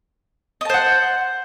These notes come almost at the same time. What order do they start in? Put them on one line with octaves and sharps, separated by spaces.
D#5 A5 C5 F#5